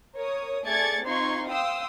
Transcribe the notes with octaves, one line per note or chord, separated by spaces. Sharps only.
A#4 C#5 D#6
A3 G#4 D5 G#6 A6 C#7
C4 D#4 F4 C6 C#6 G#6
F5 G5 C6 D#6 E6